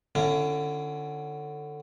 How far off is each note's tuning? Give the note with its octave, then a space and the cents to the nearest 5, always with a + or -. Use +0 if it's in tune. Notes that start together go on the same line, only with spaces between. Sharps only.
D3 +15 C#4 +0 E4 +40